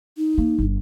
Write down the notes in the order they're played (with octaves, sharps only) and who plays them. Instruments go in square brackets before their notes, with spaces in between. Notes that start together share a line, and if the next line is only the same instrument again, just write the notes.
[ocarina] D#4
[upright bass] A#3
G1